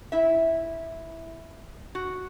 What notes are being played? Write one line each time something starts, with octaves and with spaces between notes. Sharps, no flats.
E4 E5
F#4